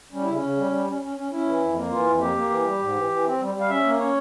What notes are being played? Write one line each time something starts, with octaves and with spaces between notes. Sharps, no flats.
G3 C#4
C#3 E4
C#4
C#3
G3
G3
C#4
C#4
C#4
C#4 E4
E3
F2
A#3
E3 F4
F2
A#3 G4
A#3
E3
G3
G#2
E3
E3
C4
G3
G3
F5
C#4 E5
A#3
C#4 C#5